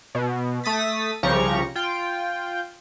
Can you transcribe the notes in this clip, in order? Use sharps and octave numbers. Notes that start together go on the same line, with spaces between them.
B2
A3 D#6 A6 B6
C2 C#3 F3 G4 A#5 C#6
F4 G5